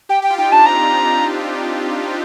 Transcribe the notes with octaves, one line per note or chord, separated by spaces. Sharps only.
G4 G5
G4 G5
F4
D#4 G5
D4 A5
C4 A#5